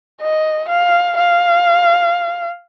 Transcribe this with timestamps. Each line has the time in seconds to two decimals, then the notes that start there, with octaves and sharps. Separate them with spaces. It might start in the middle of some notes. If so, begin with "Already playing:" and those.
0.21 D#5
0.69 F5
1.17 F5